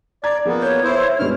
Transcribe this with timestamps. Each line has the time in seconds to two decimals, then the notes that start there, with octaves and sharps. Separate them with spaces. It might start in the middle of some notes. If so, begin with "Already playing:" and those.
0.24 D5 A#5 G#6
0.45 F3 A#3 B3 G#4
0.62 B4 C#5 G6
0.84 E4 C5
1.19 G2 B2 G#3 F6